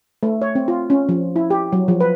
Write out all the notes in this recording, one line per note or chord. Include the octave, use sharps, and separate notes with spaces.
A3
C#5
C4
F4
C#4
F3
E4
G4
F#3
F3
B4